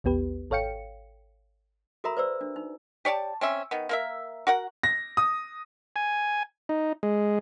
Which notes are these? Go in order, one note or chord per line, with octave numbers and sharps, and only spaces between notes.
A#1 E2 B3 G4 B4
G#1 A4 C#5 F5 G5 C#7
F#4 A4 A#4 E5 A#5 B5
B4 C5 D5 E6
D4
D#4
G4 C#5 D5 A5
C4 C#4 E5
D#3 B3
A#3 A#4 E5
F#4 A#4 F#5
A#6
D#6
G#5
D#4
G#3